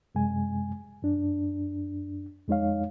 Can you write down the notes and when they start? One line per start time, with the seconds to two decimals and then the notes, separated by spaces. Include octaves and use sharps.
0.15 F#2 C3 G#3 G#5
1.02 F#2 D4
2.48 F2 G#3 D#4 C#5 F5